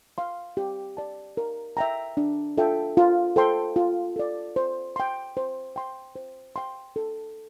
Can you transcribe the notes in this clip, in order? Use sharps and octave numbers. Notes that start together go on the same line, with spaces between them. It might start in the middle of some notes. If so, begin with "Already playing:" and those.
F5 C6
G4
D5 A5
A#4
E5 G5 A#5
D4
F4 A4 E5 G5
F4
A4 C5 G5 C6
F4
A4 D5
C5
G5 C6
C5
G5 C6
C5
G5 C6
A4